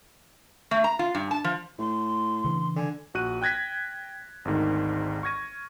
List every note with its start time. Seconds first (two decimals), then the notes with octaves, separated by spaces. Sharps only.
0.71 A3
0.84 A#5
0.99 F4
1.15 G2
1.31 A5
1.44 F3
1.79 A2 C6
2.44 C#3 E3 D4
2.76 D3 G#5
3.14 A#1 F#4 F#6 D#7
3.42 G5 F#6 G#6 A#6 B6
4.45 G#1 D2 G#2 D#3
5.23 C#6 F6 G#6 A#6 D#7